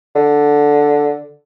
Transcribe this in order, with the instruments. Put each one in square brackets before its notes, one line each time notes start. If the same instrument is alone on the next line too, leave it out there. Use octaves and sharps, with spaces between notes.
[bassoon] D3